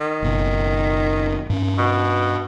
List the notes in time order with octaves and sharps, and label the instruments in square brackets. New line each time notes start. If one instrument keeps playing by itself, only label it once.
[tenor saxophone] D#3
[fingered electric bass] F#1 B2
G2 C#4
[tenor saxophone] B2